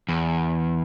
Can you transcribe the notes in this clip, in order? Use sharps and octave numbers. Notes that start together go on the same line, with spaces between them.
E2